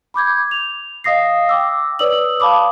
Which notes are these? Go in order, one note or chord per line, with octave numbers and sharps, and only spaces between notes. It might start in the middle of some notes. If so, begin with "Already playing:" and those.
B5 D6 G6 G#6
F7
D#5 F5 D#6 A#6 C7
G5 D6 E6
B4 C#5 D5 D#6 E6 F#7
F5 A5 B5 D6 D#6